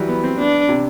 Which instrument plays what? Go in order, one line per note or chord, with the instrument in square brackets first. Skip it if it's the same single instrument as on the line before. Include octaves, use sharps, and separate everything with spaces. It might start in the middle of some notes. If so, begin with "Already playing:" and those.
Already playing: [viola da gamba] E3 [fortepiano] F#3 G3
[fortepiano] B3
C4
[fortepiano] B3 [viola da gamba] D4
[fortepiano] C3